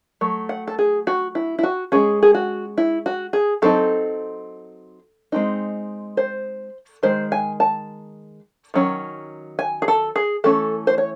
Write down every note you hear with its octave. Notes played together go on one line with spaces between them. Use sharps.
F#3 A3
F#5
A4
G#4
F#4
E4
E4
F#4
G#3 C#4 G#4
G#4
F#4
E4
F#4
G#4
F#3 C4 D#4 A4
G#3 C4 D#4
C5
D#3 G#3 C5
G#5
A5
D#3 F#3 C#4
G#5
G#4
A4
G#4
E3 A3 C#4 A4
C5
C#5